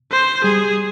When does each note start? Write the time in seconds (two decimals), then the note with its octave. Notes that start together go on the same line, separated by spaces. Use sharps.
0.11 C5
0.44 G3 G#4